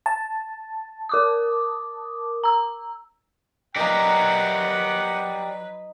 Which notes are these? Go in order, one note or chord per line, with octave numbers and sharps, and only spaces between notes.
A5
A#4 D6 D#6
A#5 E6
F#3 D#4 G4 A#4 B4 D5 F#5 A#5